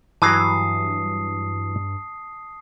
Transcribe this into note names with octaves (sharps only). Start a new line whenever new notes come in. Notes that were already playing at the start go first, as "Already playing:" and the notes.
G2 E3 F#3 A5 D#6 C7